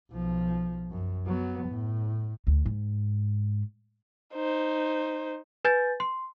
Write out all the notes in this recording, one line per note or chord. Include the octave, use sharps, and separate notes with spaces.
B1 F3
F#2
F#3 B3
A2
D2
G#2
D#4 C5
B4 G#5 G6 A6
C6